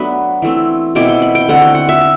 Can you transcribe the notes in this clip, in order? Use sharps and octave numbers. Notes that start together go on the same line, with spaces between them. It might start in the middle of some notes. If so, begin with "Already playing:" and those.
Already playing: F#3 A3 B3 D4 B5
E3 A3 C4
B2 A3 C4 E4 D6
C6
B5
G5
D3 A3 C4 E4 F#5
G5
F#5
E5